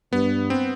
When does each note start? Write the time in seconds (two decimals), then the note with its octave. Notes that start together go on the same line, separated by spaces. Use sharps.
0.13 G2 B3
0.50 C4